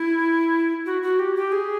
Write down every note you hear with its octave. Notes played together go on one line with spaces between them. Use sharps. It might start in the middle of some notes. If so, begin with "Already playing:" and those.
Already playing: E4
F#4
F#4
G4
G4
G#4